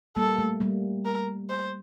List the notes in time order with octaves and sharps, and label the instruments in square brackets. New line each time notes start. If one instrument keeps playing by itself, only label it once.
[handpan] G3 A#3 [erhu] A4
[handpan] A3
G3 A#3
[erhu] A#4
C5